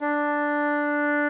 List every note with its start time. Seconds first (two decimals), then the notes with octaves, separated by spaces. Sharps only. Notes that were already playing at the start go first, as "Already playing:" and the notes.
0.01 D4